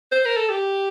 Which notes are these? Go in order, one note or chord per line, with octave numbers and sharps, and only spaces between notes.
C5
A#4
A4
G4